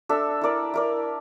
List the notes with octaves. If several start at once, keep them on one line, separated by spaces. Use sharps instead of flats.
D4 A4 E5
E4 A#4 D5
E4 A#4 D5